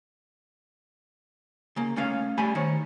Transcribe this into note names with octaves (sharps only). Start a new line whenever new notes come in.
C#3 A#3
A3 C#4 F5
G3 A3 G#5 B5
D#3 C5 C#5